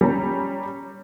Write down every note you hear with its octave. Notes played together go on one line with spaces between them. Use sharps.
G3 C#4 A#5